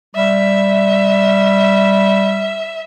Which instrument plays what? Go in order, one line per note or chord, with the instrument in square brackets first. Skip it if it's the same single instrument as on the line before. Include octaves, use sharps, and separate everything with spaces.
[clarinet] G3 [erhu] E5